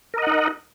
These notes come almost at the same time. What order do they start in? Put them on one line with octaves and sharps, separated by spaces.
A#4 D#5 F#5 D#4